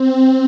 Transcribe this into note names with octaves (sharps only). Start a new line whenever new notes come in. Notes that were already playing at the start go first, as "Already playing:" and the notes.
Already playing: C4